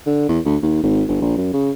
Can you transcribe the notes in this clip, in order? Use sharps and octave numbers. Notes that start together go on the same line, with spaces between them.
D3
E2
D2
D#2
G#1
G1
A#1
F#2
C#3